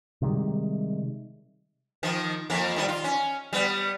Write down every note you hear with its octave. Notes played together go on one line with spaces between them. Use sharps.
C3 D#3 G3 G#3
D#3 F3
F2 A#3
D#3 G3
F4
C#4
G3 B3